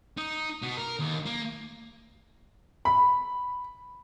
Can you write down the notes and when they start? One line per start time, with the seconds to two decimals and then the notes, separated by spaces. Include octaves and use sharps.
0.17 D#4
0.62 B2
0.77 A#4
0.99 D#2
1.26 A#3
2.85 B5